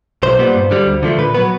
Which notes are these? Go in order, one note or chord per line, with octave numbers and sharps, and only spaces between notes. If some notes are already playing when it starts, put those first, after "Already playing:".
B1 C5
A#2 G3 B3
G2
D3 G3
D2
D3 F3 A3
A#2 B4
F#3 B3 B4